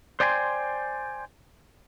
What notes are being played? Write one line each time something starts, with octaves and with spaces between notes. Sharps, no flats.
C5 D5 G5 G#5 B5 C6